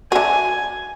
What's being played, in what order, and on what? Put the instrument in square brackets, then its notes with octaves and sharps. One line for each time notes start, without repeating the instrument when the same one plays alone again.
[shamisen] D4 G#4 [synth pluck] F#4 E5 [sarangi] G#5